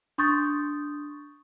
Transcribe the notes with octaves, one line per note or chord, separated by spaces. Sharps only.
D4 C6 C#6 D#6 G6 A6